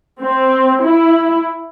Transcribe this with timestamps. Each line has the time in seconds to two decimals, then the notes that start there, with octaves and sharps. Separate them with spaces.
0.22 C4
0.82 E4